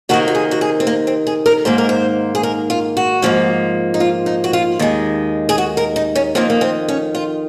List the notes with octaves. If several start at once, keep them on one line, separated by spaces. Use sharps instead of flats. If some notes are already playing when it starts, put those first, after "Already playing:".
C3 D#3 A#3 F#4
F#4
G#4
F#4
G#4
C4
A#3
C4
G#4
A#4
G#2 D#3 A#3 C5
A#4
C5
G#4
A#4
F4
F#4
G#2 F3 A#3
D#4
F4
D#4
F#4
F4
D#2 D#3 G#3
G#4
F#4
A#4
D#4
C#4
F2 D#3 A#3 C4
A#3
C4
C#4
F4